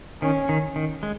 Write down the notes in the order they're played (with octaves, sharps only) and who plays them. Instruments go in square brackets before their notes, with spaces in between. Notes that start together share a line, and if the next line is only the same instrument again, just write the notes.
[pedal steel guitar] D#3 [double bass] C#4
[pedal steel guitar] D#3
D#3
G#3